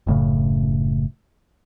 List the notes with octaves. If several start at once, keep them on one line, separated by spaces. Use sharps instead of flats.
F#1 A2 C#3